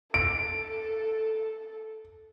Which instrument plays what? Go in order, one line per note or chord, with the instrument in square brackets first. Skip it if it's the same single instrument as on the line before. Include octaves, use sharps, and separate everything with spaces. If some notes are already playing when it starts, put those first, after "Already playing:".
[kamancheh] A4 [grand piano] D7